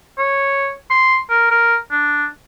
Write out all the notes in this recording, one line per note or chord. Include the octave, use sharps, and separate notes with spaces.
C#5
C6
A#4
A#4
D4